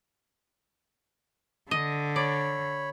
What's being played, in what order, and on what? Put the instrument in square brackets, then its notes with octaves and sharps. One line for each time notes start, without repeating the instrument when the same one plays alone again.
[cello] D3 [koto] D#5
[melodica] C#5 B5 [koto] D5